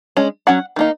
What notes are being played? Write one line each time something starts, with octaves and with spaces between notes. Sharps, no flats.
G#3 C#4
F#3 C#4 F#5
D#3 A#3 D#4